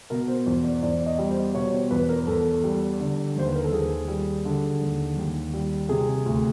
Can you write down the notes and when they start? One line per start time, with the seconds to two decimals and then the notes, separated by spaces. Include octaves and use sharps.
0.10 B2 A#4
0.28 C5
0.46 E2 C5
0.64 D5
0.83 E2 D5
1.06 D#5
1.19 G3
1.31 C5
1.54 B2 C#5
1.73 C5
1.91 E2 B4
2.09 A#4
2.27 E2 A4
2.64 G3
3.00 D3
3.36 D#2 C5
3.47 B4
3.55 A#4
3.64 A4
3.72 D#2 G#4
4.08 G3
4.45 D3
4.81 D#2
5.17 D#2
5.53 G3
5.89 C3 G#4
6.26 D2